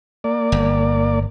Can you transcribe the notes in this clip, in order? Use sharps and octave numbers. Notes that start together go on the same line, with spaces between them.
A#3 D5
G1